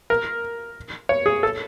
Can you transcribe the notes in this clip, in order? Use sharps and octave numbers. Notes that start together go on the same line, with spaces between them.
A#4
C#5
G#4
A4